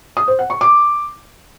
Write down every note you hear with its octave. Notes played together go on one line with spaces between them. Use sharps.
D#6
C5
F#5
C#6
D6